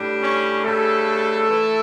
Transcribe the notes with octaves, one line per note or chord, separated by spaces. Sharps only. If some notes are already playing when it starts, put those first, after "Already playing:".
Already playing: A2 G3 D4
C#4 C#5
C#3 G3 A3 D4 A4
E3 A3 E4